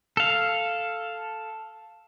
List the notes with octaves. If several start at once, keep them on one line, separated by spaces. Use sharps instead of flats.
A4 F5